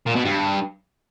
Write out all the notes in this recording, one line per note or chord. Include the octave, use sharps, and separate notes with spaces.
A#2
B2
G2